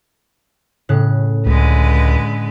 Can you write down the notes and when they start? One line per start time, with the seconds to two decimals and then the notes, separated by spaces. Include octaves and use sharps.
0.89 A2 C#3 F#6
1.46 C#2 D3 G#3 B4